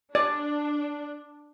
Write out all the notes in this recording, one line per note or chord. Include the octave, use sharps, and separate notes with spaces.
D4 D5